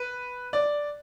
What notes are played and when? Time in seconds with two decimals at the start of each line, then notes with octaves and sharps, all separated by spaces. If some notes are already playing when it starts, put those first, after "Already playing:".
Already playing: B4
0.53 D5